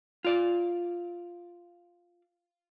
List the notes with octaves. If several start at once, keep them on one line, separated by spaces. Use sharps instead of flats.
F4 D5